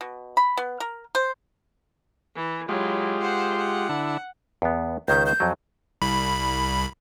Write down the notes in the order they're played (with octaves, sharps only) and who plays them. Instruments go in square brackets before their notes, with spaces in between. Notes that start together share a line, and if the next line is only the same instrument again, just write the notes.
[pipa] B2
B5
B3
A#4
C5
[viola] E3
[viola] F#3 E4 [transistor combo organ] G#3 F4 G4
[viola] C5 F#5
F#5
[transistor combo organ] D3 D4 E4
[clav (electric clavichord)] E2 B3
[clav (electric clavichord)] C#2 D#3 C#4 [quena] G6
[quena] G6
[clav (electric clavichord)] F2 F#3
[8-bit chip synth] C2 B5